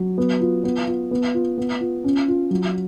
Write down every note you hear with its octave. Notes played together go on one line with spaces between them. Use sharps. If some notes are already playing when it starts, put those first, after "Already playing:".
Already playing: F#3
B3
F4
B3
F4
B3
F4
B3
F4
C#4
F4
F#3